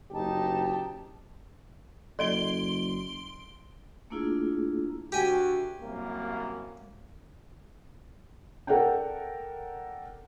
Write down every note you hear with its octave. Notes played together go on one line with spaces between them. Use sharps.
F#1 D#4 G4 A5
F#1 A4 D5 D#5 G5 C6 D7 G7
A3 A#3 D4 E4 F4 G#4
D2 F#4 G4 G#5
C2 F#2 A#3
A4 A#4 D5 F#5 G5